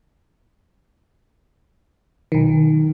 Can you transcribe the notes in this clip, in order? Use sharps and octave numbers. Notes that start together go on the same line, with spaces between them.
B1 D#3